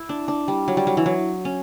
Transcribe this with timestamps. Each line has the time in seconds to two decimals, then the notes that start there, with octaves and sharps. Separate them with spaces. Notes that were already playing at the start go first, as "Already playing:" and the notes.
Already playing: E4
0.09 D4
0.28 D4
0.48 G3
0.68 F#3
0.77 G3
0.87 F#3
0.97 E3
1.06 F#3
1.45 C#4